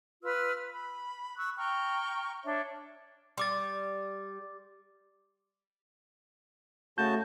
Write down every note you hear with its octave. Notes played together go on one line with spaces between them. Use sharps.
F4 B4 E6 F6
B5
C#6 E6 F#6
G5 A#5 C#6 F6
D4 C#5 E5
G3 C6 D6 A6
C#3 A3 F#4 A5 G6